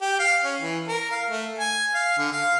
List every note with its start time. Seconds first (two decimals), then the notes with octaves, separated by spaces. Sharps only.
0.01 G4
0.19 F5
0.44 C#4
0.61 E3
0.88 A#4
1.11 F5
1.30 A3
1.58 G#5
1.94 F5
2.18 D3
2.33 F5